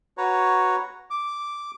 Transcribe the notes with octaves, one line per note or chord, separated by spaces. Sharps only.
F#4 B4 C#5 A#5
D6